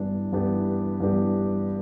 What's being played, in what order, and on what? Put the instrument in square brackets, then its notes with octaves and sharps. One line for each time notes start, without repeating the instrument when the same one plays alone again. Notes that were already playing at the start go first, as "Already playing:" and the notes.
Already playing: [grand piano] G2 E3 B3 D4 G4
G2 E3 B3 D4 G4
G2 E3 B3 D4 G4